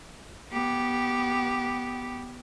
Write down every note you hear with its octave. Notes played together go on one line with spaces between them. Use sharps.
B3 G4